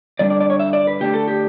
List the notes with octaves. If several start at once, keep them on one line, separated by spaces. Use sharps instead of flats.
G2 D3 G3 D4 D5
D5
D5
C#5
E5
D5
B4
D3 A3 D4 G4
A4
G4